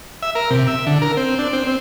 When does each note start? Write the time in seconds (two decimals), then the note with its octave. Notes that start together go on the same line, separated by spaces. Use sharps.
0.22 E5
0.35 A#4
0.50 C3
0.67 E5
0.87 D3
1.02 A#4
1.17 C4
1.39 D4
1.53 C4
1.67 C4